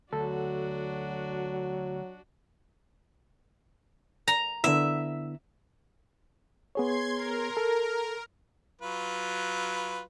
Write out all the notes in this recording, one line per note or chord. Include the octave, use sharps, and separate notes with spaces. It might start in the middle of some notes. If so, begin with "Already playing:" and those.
D2 F#3 D4 F#4 A4
A#5
D3 B3 E4 E5
B3 G#4 C#5 C6 G#6
A#4
A4
F#3 F4 B4